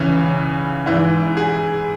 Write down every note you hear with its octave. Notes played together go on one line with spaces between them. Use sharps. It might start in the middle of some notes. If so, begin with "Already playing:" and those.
Already playing: C#2 C#3 E3 C#4
G#2 E3 E4
G#4